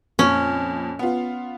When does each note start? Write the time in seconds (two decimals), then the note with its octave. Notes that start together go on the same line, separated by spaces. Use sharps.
0.19 F2 A#2 C#4
0.99 B3 F4